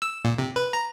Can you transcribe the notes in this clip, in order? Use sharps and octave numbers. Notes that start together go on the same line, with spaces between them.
E6
A#2
C3
B4
A#5